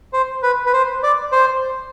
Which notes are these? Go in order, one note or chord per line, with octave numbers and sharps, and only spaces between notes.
C5
B4
B4
C5
D5
C5